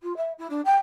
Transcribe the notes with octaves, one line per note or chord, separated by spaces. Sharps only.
F4
E5
E4
D4
G5